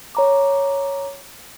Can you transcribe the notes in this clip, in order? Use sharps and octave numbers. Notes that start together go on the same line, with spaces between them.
C#5 A#5 D6